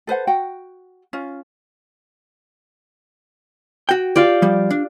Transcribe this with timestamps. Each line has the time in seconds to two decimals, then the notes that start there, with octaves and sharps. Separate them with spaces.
0.07 A4 B4 C5 F#5
0.27 F#4 F#5 G5
1.13 C#4 F4
3.89 F#4 G5
4.16 F4 G4 D5
4.42 F3 G3
4.70 D4